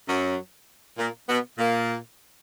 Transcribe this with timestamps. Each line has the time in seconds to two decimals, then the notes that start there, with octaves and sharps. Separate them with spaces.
0.08 F#2 F#3
0.98 A#2 A#3
1.27 B2 B3
1.58 A#2 A#3